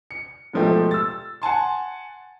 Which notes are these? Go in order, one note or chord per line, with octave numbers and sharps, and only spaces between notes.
C#7
G#2 B2 F3 A3 G4
E6 A6
F#5 G#5 A5 C6